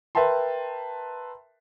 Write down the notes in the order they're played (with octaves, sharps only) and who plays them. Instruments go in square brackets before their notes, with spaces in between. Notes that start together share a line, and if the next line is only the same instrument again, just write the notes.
[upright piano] A#4 B4 E5 G5 A5 C6